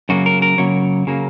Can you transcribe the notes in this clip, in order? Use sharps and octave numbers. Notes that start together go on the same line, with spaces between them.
F#2 C#3 F#3 A#3 F#4
A#4
A#4
F#2 C#3 F#3 A#3 C#5
C#3 F#3 A#3